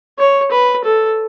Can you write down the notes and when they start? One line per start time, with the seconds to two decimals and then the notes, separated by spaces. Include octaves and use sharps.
0.18 C#5
0.51 B4
0.84 A4